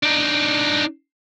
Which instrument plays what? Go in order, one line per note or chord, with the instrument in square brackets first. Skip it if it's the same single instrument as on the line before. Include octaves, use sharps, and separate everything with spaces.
[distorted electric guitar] D4 D#4